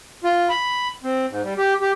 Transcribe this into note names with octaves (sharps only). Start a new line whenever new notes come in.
F4
B5
C4
G#2
G3
G4
G4